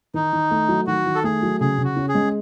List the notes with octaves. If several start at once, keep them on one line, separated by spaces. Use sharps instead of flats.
D#3 D#4
D#3
A3
F#3
D#3 F#4
D#3
A4
A3 G#4
F#3
C#3 G#4
C#3
F#4
C#4
G#4
G#3